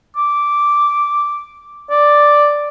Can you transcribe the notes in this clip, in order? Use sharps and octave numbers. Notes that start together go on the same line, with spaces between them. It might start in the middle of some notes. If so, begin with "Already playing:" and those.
D6
D5